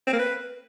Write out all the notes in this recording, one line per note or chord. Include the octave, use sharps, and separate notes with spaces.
C4
A#3
B4